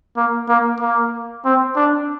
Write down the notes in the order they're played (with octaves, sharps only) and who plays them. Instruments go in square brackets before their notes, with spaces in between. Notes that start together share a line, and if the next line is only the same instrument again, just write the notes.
[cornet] A#3
A#3
A#3
C4
D4